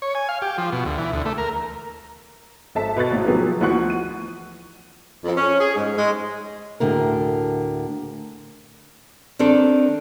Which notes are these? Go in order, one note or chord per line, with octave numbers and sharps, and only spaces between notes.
C#5
G#5
F5
G4
F3
B2
D2
E3
D2
A3
A#4
G#1 A4 E5 A5 B6
B2 B4 C#6 F#6 A6
G#1 A2
D#3 F3 F#3 B3 G#4
D2 E3 F3 F#5 C#6 F#6
D#7
F2
C#4
G#4
G#2
G#3
D2 A2 D3 G#4 A#4
D#3 C4 D4 A4